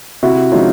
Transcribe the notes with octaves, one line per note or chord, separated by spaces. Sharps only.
C3 E4 F#4
F3 G#3 C#4 D#4 F4